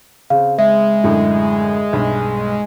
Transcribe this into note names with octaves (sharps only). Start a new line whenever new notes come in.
C#3 C4 F5
G#3 E5
F#2 A2 D3
B1 G2